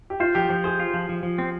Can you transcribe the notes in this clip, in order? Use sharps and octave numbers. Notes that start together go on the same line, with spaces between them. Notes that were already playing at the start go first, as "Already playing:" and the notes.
G4
F4 C5
F3 G4
F3 G4
G#4 C5
F4
F3
F3
F3
C4